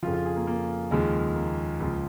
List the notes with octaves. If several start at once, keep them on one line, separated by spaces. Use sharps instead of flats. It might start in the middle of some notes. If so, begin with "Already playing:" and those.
F2 C#3 F3 F4
F4
G#4
A#3
A#3
D#2 C#3 F3 G#3
A#3
C#2 C#3 F3